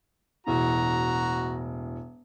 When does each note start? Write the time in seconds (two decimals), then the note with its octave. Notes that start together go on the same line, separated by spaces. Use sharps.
0.47 E1 A2 F#4 A#5